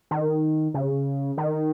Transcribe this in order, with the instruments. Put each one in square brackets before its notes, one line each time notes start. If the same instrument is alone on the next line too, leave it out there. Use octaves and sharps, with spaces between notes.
[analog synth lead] D#3
C#3
D#3